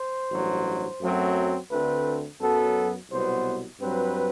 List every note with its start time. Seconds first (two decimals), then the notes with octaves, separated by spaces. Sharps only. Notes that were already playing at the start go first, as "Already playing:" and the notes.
Already playing: C5
0.31 A1 G2 F#3
1.01 F#2 F#3 A3 C4
1.71 D2 D3 A3 C4 B4
2.41 F#2 F#3 B3 A4
3.11 C2 B2 F#3 B3 C5
3.80 G2 F#3 C4 B4